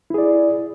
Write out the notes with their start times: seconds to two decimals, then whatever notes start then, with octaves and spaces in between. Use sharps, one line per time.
0.10 E4
0.14 G#4
0.18 D5